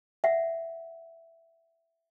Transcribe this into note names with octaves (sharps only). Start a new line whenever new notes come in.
E5 F#5